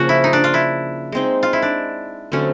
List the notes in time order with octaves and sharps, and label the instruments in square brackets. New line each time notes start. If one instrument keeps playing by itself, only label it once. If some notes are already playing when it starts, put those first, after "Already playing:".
Already playing: [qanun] C#3 F3 A#3 C#4 [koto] F#4
[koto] E4
D#4
D4
F4
E4
[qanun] G#3 C4 D#4
[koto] F4
E4
D4
[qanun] D3 F#3 A3 C4 [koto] C#4